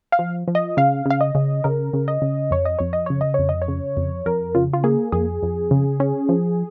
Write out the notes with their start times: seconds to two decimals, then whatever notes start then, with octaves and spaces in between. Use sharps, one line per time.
0.12 F5
0.19 F3
0.48 F3
0.55 D#5
0.77 C#3 F5
1.06 C#3 F5
1.21 D#5
1.35 C#3
1.64 C#3 A#4
1.93 C#3
2.08 D#5
2.22 C#3
2.51 F2 C#5
2.65 D#5
2.79 F2 C#5
2.93 D#5
3.06 C#3 C#5
3.21 D#5
3.34 F2 C#5
3.49 D#5
3.62 C#5
3.68 C#3
3.97 F2
4.26 F2 A#4
4.55 C#3 F4
4.73 F4
4.84 A#3 G#4
5.12 F2 G#4
5.43 F2
5.71 C#3
6.00 C#4
6.29 F3